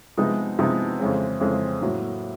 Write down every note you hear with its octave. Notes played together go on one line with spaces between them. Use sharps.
C3 F3 G#3 B3 D#4
C3 F3 G#3 B3 D#4
F2 C#3 E3 G#3 C4
F2 C#3 E3 G#3 C4
A2 F#3 A#3